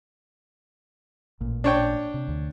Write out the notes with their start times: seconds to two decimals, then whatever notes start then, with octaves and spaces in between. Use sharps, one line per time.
1.40 A1 A#2
1.64 D4 C#5 G5
2.14 C3
2.28 D2